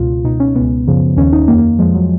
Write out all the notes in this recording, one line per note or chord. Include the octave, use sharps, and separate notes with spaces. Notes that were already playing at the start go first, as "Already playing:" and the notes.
Already playing: C#2 B2 F4
C#2 B2 D#4
C#4
C#2 B2 B3
F#2 C#3 F3
D#2 D#3 C#4
D#4
F2 D#3 A#3
A#3
F2 F3 G#3
F#3